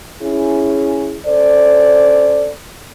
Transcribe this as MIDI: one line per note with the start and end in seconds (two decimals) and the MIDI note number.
0.22 1.18 61
0.22 1.18 64
0.22 1.18 68
1.26 2.51 61
1.26 2.51 69
1.26 2.51 72
1.26 2.51 74